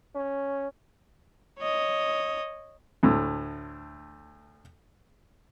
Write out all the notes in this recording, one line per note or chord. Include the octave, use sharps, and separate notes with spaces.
C#4
C#5 D#5
D2 A2